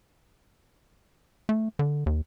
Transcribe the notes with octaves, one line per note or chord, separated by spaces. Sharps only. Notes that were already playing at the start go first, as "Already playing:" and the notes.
A3
D3
D#2